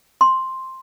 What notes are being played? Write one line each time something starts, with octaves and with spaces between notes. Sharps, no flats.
C6